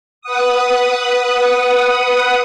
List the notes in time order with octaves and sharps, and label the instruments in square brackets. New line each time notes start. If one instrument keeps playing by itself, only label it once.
[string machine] B4 F#5 D#6